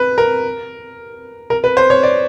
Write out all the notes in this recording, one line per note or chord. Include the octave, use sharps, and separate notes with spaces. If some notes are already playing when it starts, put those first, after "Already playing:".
Already playing: B4
A#4
A#4
B4
C5
C#5
D5